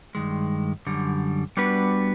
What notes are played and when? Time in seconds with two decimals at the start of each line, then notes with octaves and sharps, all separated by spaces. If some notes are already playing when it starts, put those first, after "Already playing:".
0.15 G2 D#3 G#3
0.86 F#2 D3 G3
1.57 G3 B3 D4 F#4 B4